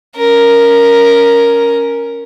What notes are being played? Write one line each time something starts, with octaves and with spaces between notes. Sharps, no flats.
C#4 A#4